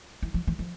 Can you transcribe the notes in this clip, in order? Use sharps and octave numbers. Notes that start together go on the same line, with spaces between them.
E3
F3
E3
F3